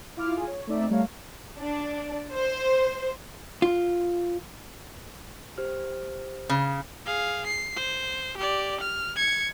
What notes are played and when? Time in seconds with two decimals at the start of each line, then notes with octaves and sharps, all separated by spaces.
0.17 E4 F4 F5 D6 F6
0.36 F4 G#4 G#5
0.47 C#5
0.67 A3 C4 D#4 D5 E5
0.90 G3 A3 A#4 C#5 F5
1.59 D4
2.33 C5
3.62 F4
5.58 G4 C5 F6
6.49 C#3
7.06 G#4 F5
7.46 C7
7.76 C5
8.37 G4 D5
8.80 F6
9.16 G#6 C#7